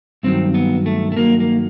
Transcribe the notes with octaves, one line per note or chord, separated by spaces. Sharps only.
G2 D#3 F#3 C4
B3
A3
A3
G2 D#3 F#3 A#3
A#3